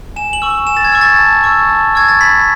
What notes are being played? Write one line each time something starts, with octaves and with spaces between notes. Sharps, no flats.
G#5 E7
F#7
C#6 E6
F#7
G#5 E7
A6
G#6
C#6 E6
A6
A5
C#6 E6
A5
C#6 E6 G#6
A6
B5 B6